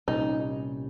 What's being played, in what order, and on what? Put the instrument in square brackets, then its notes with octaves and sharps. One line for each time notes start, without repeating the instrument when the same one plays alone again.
[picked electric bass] C2 A#2 G3 C#4 [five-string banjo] D#4